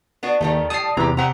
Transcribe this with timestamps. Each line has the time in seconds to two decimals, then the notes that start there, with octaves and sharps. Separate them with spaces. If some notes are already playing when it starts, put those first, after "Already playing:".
0.23 B3 D4 F#4
0.41 D#2 D#3 G3 A3
0.70 A2 G3 A5 D#6 C7
0.97 E2 C3 E3 G4 A#5
1.17 C3 C4 G4 F#5 A#5